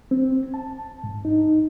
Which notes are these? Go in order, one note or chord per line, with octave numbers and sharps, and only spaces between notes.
C4
A5
G#2
D#4